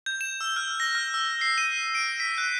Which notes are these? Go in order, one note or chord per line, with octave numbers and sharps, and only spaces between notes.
G6
E7
E6
F6
A#6
F6
E6
C7
D#7
D7
B6
F#6